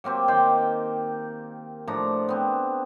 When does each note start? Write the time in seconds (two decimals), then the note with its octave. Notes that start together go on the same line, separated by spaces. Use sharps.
0.04 F#3 A#3 C4 G4
0.28 D#3 G5 C6 D6
1.87 A2 F3 D4 A#5
2.29 B3 C4